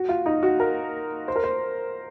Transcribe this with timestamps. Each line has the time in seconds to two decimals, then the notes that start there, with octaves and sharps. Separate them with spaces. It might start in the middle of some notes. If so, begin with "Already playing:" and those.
Already playing: F#4
0.09 F4
0.26 D#4
0.43 F#4
0.60 A#4
1.28 C5
1.36 A#4
1.43 C5